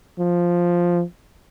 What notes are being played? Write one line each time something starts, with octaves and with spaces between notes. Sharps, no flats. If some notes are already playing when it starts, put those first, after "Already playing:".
F3